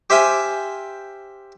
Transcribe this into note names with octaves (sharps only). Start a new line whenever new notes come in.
G4 C5 E5 F5 G5 G#5